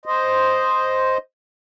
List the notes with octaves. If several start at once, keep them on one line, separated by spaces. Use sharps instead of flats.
C5 D#5